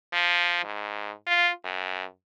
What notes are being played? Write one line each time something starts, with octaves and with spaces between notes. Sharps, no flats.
F3
G#2
F4
F#2